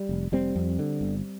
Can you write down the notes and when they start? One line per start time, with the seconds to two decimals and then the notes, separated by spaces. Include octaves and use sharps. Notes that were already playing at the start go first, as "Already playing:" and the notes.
Already playing: G3
0.09 F1
0.32 F1 G3 C4
0.56 F2
0.79 D3
1.01 G1